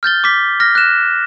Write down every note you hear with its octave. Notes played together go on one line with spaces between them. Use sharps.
F6 G6 A6 G7
D6 B6
F6 A#6
F#6 E7